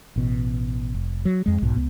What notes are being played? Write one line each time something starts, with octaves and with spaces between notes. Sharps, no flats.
A1 B2
F1
F#3
F2 G#3
B1 G#2 B2
C#2 B3